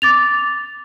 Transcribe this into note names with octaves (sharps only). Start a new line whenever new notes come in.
D6 A6 F7